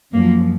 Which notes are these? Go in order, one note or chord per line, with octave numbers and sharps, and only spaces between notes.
F#2 F3 A#3